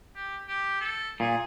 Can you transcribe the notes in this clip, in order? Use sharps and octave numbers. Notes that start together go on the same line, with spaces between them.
G4
G4
A4
A#2 G#4